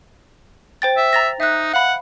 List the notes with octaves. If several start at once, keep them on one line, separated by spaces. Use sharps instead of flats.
C5 G5 A6
E5
A#5 A6 A#6
D#4 E5 F#6
F5 F#5 B5